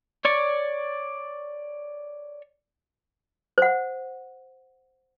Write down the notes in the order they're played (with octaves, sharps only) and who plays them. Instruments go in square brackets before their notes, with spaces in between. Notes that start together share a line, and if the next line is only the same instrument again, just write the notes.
[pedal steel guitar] C#5 D5 C#6
[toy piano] C5 F#5